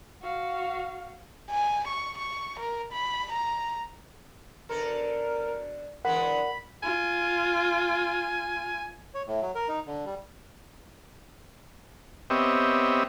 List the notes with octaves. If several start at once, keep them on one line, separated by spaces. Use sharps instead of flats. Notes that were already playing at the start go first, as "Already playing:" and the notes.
F#4 F5
G#5
C#6
C#6
A#4
B5
A#5
B2 D3 A4 A#4
D3 E3 G#3 A#4 F#5 B5
F4 G#5
C#5
A2
F#3
A#4
D#4
D3
G3
B3 C4 G4 C#5 D#5 E5